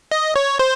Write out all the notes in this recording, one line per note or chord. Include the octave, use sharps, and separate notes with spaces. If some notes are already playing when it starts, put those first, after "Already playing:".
D#5
C#5
C5